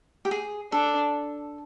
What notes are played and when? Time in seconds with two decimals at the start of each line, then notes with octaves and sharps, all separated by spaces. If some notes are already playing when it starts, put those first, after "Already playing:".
0.25 G4
0.31 G#4
0.72 D4 A4